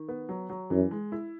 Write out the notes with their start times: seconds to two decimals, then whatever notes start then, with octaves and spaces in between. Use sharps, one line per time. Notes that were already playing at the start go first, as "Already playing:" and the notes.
Already playing: D#3
0.08 B3
0.29 F#3
0.50 F#3
0.70 F#2 E3
0.91 G#3
1.12 E4